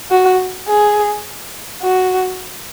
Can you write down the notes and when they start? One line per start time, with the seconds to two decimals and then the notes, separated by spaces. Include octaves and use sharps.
0.11 F#4
0.68 G#4
1.83 F#4